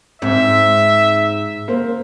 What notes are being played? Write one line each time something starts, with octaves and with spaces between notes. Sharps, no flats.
G#2 C4 E5
A#3 C5